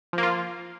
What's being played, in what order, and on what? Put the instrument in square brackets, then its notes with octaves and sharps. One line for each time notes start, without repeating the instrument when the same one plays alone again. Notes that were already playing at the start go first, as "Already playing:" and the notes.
[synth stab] F3
A#3
F4